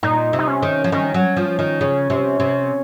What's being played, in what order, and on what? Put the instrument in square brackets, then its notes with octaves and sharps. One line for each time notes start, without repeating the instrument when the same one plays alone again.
[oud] A#2 [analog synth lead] D#4
[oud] C3
[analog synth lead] D#4
C#4
[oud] D#3
F3
[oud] D#3 [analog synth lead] C#4
[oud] F#3
F3
D#3
C#3
C3
C3